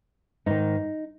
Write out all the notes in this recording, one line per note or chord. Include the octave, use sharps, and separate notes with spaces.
G#2 D#3 D#4